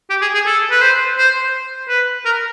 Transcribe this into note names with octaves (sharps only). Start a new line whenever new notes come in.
G4
G#4
G#4
A4
B4
C5
C5
B4
A#4